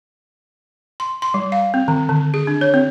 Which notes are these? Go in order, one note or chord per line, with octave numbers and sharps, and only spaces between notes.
C6
C6
G3
F5
C4
D#3
D3
G#4
D4
C#5
C4